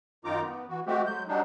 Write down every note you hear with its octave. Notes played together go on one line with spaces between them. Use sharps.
F#2 D#3 D#4 F4 A#5 D6
B3
E3 F#4
G#3 A3 C4 F#4 G4
F#3 G#3 G6
F#3 G3 D4 D#4